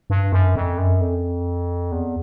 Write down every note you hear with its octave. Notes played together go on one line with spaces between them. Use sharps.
G2
F#2
F2
F#2
F2
E2